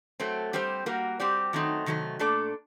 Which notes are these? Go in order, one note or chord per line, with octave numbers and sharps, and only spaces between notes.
F#3 A3 C4
G3 C4 G4 C5
G3 A#3 F#4 A#4
G3 C4 G4 D5
D#3 F#3 A3 C4 D#4
C3 D#3 F#3 A3
A#2 A3 D4 A4 D5